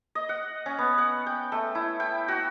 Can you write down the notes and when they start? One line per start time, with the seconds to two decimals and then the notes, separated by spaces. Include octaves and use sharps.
0.15 D#5
0.29 F#5
0.66 C#4
0.79 B3
0.98 F#5
1.26 G5
1.52 A3
1.75 E4
2.00 G5
2.28 F#4